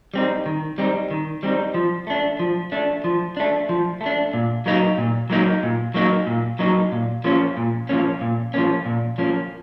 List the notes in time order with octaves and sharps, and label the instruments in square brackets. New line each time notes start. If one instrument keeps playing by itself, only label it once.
[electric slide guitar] G3 C4 D#4
D#3
G3 C4 D#4
D#3
G3 C4 D#4
F3
A3 D4
F3
A3 D4
F3
A3 D4
F3
A3
D4
A#2
F#3 A#3 D#4
A#2
F#3 A#3 D#4
A#2
F#3 A#3 D#4
A#2
F#3 A#3 D#4
A#2
F3 A#3 C#4
A#2
F3 A#3 C#4
A#2
F3 A#3 C#4
A#2
F3 A#3 C#4